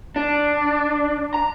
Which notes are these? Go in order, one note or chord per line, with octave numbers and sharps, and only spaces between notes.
D4
A#5